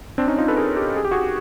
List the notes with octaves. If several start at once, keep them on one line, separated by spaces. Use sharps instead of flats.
C4 D4
C#4 D#4
D#4 F4
A4 B4
G#4 A#4
G4 A4
G#4
G4
F#4 G#4